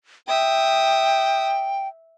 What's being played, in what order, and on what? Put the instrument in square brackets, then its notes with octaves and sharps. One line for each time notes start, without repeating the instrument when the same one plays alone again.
[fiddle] E5 D#6 [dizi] G5